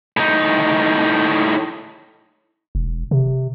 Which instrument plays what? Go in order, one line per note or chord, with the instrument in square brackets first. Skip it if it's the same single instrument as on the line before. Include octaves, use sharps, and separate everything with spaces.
[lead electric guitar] A2 D#4
[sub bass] E1
C3